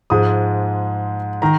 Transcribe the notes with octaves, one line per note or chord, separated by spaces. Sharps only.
G#2 F3 G#3 D#6
D#3 A#5